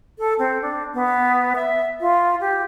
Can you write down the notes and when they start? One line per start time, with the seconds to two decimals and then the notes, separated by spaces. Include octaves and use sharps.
0.19 A4
0.39 C4
0.62 D4
0.94 B3
1.55 E5
2.01 F4
2.40 G4